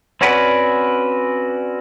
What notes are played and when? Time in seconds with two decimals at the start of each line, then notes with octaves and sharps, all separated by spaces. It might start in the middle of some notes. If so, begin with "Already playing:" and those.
0.21 C4 C#4 F#4 B4 D5